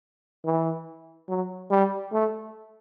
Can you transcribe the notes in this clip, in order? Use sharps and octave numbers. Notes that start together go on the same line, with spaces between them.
E3
F#3
G3
A3